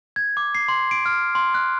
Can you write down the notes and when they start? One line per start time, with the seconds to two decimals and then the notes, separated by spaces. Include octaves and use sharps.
0.16 G#6
0.37 D6
0.55 C7
0.68 C6
0.91 D7
1.06 F6
1.35 C6
1.54 F#6